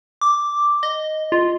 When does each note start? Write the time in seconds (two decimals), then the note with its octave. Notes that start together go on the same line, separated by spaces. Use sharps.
0.21 D6
0.83 D#5
1.32 F4